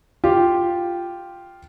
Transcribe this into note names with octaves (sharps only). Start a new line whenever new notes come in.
F4 G4